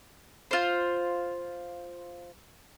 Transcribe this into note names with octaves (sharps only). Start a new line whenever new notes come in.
F4 C5